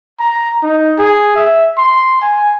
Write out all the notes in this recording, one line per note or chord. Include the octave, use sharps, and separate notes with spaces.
A#5
D#4
G#4
E5
C6
G#5